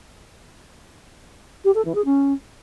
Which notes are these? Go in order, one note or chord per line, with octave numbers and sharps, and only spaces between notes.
G4
A4
E3
G#4
C#4